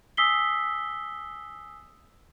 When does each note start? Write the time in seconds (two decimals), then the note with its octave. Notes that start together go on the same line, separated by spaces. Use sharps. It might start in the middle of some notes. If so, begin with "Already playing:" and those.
0.17 G#5 D#6 E6 B6 C7 G7